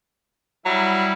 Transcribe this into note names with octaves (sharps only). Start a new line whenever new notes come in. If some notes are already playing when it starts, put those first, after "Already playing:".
F#3 G3 E4